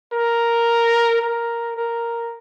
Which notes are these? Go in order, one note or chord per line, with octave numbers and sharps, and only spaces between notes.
A#4
A#4
A#4